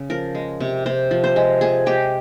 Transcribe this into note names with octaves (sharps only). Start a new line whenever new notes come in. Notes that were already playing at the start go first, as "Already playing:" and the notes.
Already playing: C#3
F3 A#4
G#3
C3
C3 C5
F3
C5
G#3
F3 G#4
G#3 G4